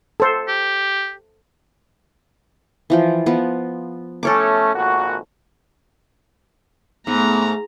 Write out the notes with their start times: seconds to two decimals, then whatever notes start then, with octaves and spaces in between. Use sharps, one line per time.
0.20 A4 C5
0.48 G4
2.90 E3 F3 G5
3.26 F3 B3
4.23 A3 C#4 A4 C#5 D6
4.73 G#1 A#2 F#4
7.07 G#2 A3 B3 A#5